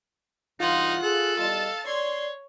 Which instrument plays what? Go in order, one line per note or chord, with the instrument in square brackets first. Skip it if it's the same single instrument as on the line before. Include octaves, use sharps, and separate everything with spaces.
[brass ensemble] B1 G2 E3 [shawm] D#4 [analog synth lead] F4 [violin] F#5 C6
[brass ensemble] G#4 [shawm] A4 [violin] F#6
[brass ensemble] E2 G3 D#5 [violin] F5 A5
[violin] C#5 G#6 [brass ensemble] D5 [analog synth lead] C6